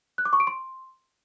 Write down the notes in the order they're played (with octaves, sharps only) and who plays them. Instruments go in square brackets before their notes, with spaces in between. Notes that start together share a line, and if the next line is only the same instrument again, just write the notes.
[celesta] F#6
D6
C#6
D7
C6